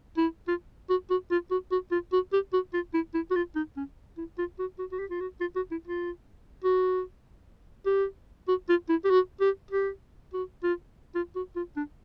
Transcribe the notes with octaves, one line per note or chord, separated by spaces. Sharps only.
E4
F4
F#4
F#4
F4
F#4
F#4
F4
F#4
G4
F#4
F4
E4
E4
F#4
F4
D#4
C#4
E4
F4
F#4
F#4
F#4
G4
F4
F#4
F4
F#4
E4
F4
F#4
G4
F#4
F4
E4
G4
F#4
G4
G4
F#4
F4
F4
F#4
F4
D4